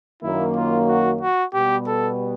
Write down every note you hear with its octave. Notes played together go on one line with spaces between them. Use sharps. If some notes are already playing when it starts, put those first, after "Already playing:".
F#2 D#3 F#3 A#3 E4
F4
F#4
F#4
B2 G3 B3 G4
A4